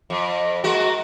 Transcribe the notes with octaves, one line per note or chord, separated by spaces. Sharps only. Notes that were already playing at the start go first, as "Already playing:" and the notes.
F2
G#3 A#3 F#4